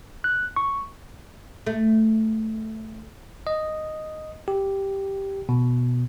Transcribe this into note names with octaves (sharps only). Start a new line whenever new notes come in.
F#6
C#6
A3
D#5
G4
B2